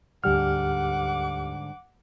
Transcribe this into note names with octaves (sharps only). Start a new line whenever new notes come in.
D2 G#2 D3 G3 G4 F#5 D6 F6